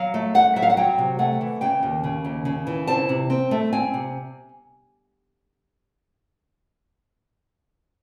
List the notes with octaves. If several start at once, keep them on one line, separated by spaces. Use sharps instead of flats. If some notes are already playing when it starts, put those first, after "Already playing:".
Already playing: F#3 F5
A3
A3 F#5
F#3 E5
F5
F#5
F#3 G5
C3
A3 F#5
E3
C#3 G5
D#2
C#3
D#2
C#3
E3
C4 A5
C3
C4
A3
C4 G#5
C3